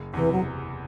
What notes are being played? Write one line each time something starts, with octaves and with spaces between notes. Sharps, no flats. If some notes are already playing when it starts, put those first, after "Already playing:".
Already playing: F#1
E2 C3 E3
F#3